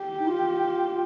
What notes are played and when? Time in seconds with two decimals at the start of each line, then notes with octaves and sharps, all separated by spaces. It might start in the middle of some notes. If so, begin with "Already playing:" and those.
Already playing: G4
0.20 D#4
0.27 F4